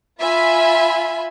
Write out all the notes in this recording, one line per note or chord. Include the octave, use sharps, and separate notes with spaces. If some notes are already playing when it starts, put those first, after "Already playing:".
F4 E5 G#5 B5